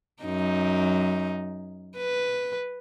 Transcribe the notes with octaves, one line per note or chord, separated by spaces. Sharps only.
F#2 D#4
B4